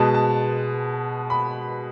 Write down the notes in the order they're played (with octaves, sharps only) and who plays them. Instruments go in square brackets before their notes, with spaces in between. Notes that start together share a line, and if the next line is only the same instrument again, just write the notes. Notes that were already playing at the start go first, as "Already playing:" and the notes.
Already playing: [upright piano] B2 G#3 B3 A5
A5
B5